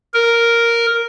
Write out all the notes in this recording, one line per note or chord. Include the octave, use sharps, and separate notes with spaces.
A#4